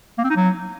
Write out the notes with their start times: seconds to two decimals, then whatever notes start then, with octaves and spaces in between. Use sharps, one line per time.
0.18 A#3
0.24 C4
0.30 D#4
0.36 F#3